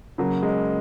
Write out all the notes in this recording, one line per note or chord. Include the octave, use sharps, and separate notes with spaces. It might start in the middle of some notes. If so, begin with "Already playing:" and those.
C#3 F#3 A#3
G#3